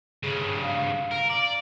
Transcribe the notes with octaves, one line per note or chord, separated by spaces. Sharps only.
G2 C#3 G#4
F5
A#4
D5